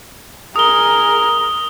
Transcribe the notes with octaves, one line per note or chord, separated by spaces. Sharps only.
G#4 A#4 D#6 G7